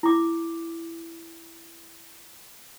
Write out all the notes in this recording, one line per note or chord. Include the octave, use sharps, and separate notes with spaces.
E4 D6